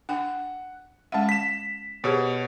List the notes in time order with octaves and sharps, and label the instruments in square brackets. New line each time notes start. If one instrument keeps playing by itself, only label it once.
[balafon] D4 G5 [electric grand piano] F#5
[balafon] G#3 C#4 F#5 [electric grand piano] E5 A5
[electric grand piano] B6 E7
[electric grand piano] B2 C#5 [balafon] G4 G#4 C5